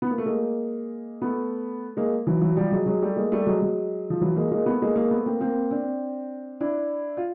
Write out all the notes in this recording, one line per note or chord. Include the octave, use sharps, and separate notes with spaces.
B3
A#3
A3
G#3 A#3
A3 B3
G#3 A#3
E3 F#3
E3 F#3
F3 G3
F#3 G#3
F#3 G#3
G3 A3
G#3 A#3
G3 A3
F#3 G#3
F#3 G#3
F3
E3 F#3
G#3 A#3
G#3 A#3
A3 B3
G#3 A#3
G#3 A#3
A3 B3
A#3 C4
A#3 C4
C4 D4
D4 E4
F4